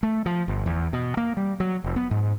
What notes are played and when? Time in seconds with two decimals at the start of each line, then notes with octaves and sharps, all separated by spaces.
0.03 A3
0.26 F3
0.48 G1
0.66 E2
0.93 B2
1.17 A#3
1.37 G3
1.60 F#3
1.84 F1
1.96 B3
2.11 G#2